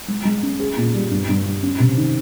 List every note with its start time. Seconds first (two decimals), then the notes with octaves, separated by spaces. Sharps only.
0.08 G#3
0.25 G#3
0.43 C#4
0.60 G#4
0.77 A#2
0.94 G3
1.11 G2
1.29 G2
1.46 G3
1.63 C#4
1.80 C3
1.97 D#3